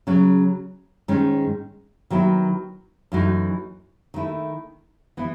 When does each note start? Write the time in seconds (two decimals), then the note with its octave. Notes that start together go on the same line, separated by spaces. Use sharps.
0.07 C#3 F#3 C#4 F#4
1.08 G#2 D#3 G#3 C#4
2.10 D#3 F#3 B3 E4
3.12 F#2 E3 A3 D#4 F#4
4.14 D#3 A3 E4
5.17 E3 B3 E4